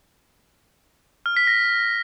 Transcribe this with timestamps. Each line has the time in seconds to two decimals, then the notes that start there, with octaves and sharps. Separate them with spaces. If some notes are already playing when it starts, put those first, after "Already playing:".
1.26 F6
1.37 B6
1.47 A#6